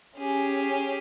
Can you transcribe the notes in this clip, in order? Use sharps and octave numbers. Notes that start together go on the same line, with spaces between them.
C#4 G4 G#4